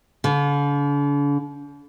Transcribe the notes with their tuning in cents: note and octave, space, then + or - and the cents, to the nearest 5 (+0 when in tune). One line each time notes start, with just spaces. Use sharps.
D3 -45